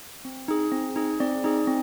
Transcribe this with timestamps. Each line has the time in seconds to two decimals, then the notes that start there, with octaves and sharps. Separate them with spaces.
0.25 C4
0.48 D#4 G#4
0.72 C4
0.96 D#4 G#4
1.20 C4 D5
1.44 D#4 G#4
1.67 C4